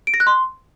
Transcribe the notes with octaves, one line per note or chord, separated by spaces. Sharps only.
D7
A#6
F#6
C6